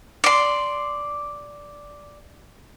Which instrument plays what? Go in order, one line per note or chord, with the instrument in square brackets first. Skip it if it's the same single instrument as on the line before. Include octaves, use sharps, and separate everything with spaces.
[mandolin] D5 C6